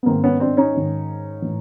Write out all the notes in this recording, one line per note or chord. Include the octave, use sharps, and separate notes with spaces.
B3
G#2 D#3 A#3 C4
B3 C#4
C4 D4
C#4 D#4
G#2 D#3
A2 E3